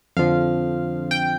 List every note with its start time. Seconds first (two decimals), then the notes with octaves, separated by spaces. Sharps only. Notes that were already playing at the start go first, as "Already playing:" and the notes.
0.17 F2 D3 F3 F5
1.11 G5